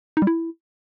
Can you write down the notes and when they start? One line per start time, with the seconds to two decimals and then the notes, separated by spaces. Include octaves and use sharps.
0.17 D#4
0.22 G3
0.27 E4